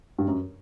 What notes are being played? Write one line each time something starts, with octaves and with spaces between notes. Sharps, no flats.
G2
F#2